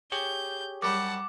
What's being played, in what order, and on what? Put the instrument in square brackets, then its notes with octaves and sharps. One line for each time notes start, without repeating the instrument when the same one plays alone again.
[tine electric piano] G4 G#4 C#5 [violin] G6
[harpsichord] F#2 G3 [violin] F#5 A5 [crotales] D6